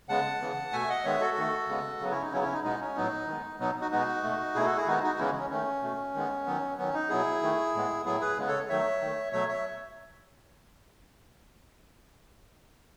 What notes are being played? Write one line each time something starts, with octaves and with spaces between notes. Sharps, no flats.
C#3 G#3 B3 F#5 A5
C#3 E3 B3
B2 A3 E5 G#5
D#5 F#5
D#3 G#3 B3 C#5 E5
F#4 A4
D#3 A3
C#3 G#3 B3
C#3 F#3 B3
C#4 E4
D#4
C#3 F#3 B3 C#4 E4
C#4 E4
D#4
B2 G#3 B3 D#4
C#4
A2 F#3 B3 D#4
D#3 G#3 B3
B2 F#3 B3 D#4
D#4 F#4
B2 G#3 B3 D#4 F#4
B2 A3
B2 A3 E4 G#4
F#4 A4
E4 G#4
D#3 G#3 B3 D#4 F#4
D#4 F#4
C#3 E3 G#3 B3 C#4 E4
C#4
D#3 A3 C#4
B2 A3
D#3 G#3 B3
D#3 F#3 B3
D#3 F#3 B3 C#4
D#4
B2 F#3 B3 E4 G#4
D#3 A3
A2 G#3 B3
A2 F#3 B3 E4 G#4
G#4 B4
C#3 G#3 B3
A4 C#5
D#3 F#3 A3 C#5 E5
D#3 A3
B2 F#3 A3 C#5 E5
C#5 E5